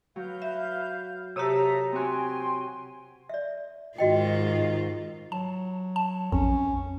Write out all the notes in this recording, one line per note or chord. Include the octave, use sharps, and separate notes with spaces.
F#3 B4 F5 G6
E5
C3 G4 A4 C#5 E5 A#5 D#6 E6
C4 F#4 G5 G#5 C6
D5 E5
G#2 D#3 F4 F#4 D#5 G5
F#3 A5
A5
A#1 F2 C#4